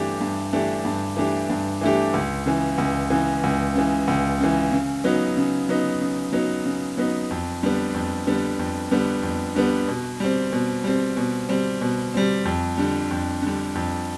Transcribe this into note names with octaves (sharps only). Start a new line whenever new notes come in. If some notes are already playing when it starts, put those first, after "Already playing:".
Already playing: G2 E3 A3 D4 G4
G2
E3 A3 D4 G4
G2
E3 A3 D4 G4
G2
E3 A3 D4 G4
C#2
C#3 E3
C#2
C#3 E3
C#2
C#3 E3
C#2
C#3 E3
C#3
F#3 B3 D#4
C#3
F#3 B3 D#4
C#3
F#3 B3 D#4
C#3
F#3 B3 D#4
F2
D3 G3 B3
F2
D3 G3 B3
F2
D3 G3 B3
F2
D3 G3 B3
B2
G3 C4
B2
G3 C4
B2
G3 C4
B2
G3 C4
F2
D3 G3
F2
D3 G3
F2